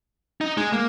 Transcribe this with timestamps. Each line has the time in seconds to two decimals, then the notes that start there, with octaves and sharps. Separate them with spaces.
0.41 D#4
0.57 G#3
0.73 A#3